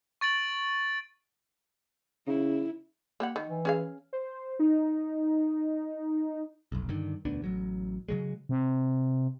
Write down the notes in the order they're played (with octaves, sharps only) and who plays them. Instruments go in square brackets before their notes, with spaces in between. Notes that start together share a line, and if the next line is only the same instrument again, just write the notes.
[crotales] C#6 A6 D7 F#7
[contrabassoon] C#3 [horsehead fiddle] E4
[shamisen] A#3 G4 F#5
D#3
[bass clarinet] E3
[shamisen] C#4 G#4 F5
[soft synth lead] C5
D#4
[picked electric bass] F1 B1
G2 D3 D#3
E1 D2 B3 D4
A1 F#3
C#3 F#3 G#3
[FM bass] C3